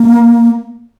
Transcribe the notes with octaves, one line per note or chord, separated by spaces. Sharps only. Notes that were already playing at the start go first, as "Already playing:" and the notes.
Already playing: A#3